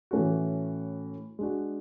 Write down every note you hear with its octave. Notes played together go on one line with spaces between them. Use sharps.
A2 E3 A3 C#4 F#4
G#3 D4 F#4